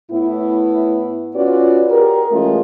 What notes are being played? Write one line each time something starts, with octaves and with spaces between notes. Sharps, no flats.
A2 B3 E4
C#4 F4 F#4 B4 D5
G4 G#4 A#4
E3 G#3 A3 C#4 F4